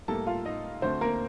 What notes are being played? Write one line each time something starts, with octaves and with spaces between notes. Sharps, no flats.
A2 G3 A#3 A4 A5
F4 F5
D#4 D#5
D2 D3 A3 C4 C5
A#3 A#4